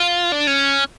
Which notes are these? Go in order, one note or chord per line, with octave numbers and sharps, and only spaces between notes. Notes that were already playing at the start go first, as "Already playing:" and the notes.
Already playing: F4
D4
C#4